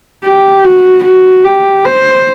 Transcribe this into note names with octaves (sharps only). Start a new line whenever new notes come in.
G4
F#4
F#4
G4
C5